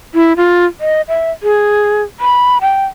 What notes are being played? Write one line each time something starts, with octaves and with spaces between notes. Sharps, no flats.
E4
F4
D#5
E5
G#4
B5
G5